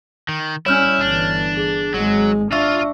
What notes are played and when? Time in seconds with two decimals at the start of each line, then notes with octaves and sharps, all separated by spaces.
0.28 D#3
0.66 G3 C#4 E4 C#5 F6 G6
1.01 G1 E3 D4
1.57 G#4
1.94 G#1 F#3 G#3
2.52 D4 F4 E5 F5 C#6 E6